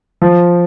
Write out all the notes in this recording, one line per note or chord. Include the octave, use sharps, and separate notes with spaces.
F3